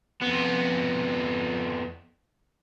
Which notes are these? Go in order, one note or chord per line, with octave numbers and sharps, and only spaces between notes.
F2 B3